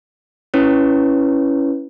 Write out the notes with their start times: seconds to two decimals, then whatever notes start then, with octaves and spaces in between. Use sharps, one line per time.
0.54 C#4 E4 B4 C#5